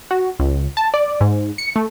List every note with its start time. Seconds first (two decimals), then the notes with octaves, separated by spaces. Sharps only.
0.11 F#4
0.39 C#2
0.77 A5
0.94 D5
1.21 G#2
1.58 C#7
1.76 A3